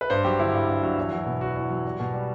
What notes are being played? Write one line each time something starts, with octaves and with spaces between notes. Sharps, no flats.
B4
G2 C5
F#3 G4
D3 E4
G2
G2
F#3
E2
F#3
B2
E2 F#4
E2
F#3
G3
B2
G3